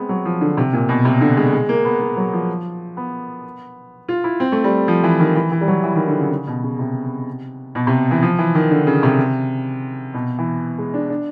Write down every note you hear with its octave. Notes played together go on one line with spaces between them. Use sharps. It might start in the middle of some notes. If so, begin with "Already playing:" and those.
Already playing: G#3 B3 C4
F#3
F3
D3
C3
A#2
B2
C3
D3
G#3
G#3
A#3
B3
A#3
F#3
F3
B3
F4
E4
C4
A3
G3
F3
E3
D#3
E3
E3
G3
F#3
E3
D#3
D3
C#3
C#3
B2
C#3
C3
B2
C3
E3
F3
E3
D#3
D3
C#3
C3
B2
E3
G#3
D4
D4